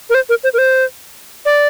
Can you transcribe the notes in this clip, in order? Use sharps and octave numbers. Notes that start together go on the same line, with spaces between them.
A#4
C5
A#4
C5
A#4
C5
D5